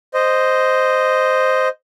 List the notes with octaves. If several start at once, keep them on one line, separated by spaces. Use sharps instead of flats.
C5 D#5